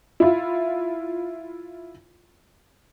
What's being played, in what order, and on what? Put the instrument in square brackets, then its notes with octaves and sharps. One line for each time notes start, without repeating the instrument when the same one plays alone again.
[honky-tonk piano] E4 F4